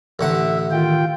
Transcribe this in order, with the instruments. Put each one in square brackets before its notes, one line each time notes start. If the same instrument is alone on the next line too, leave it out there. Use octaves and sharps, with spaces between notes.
[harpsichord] A1 D3 F#5 [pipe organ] E5
[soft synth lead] D#3 [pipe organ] F4 G5